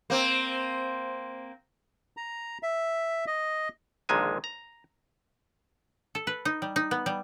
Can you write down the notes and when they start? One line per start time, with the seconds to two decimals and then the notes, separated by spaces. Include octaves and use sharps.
0.10 A#3 C4
2.17 A#5
2.63 E5
3.27 D#5
4.09 A#1 A#2 D3 D#3 G#3 G#5
4.44 A#5
6.15 A4
6.27 B4
6.45 D#4
6.62 G3
6.76 D#4
6.91 B3
7.06 G3